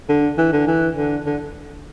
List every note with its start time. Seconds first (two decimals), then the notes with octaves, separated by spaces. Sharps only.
0.09 D3
0.38 E3
0.53 D3
0.67 E3
0.97 D3
1.26 D3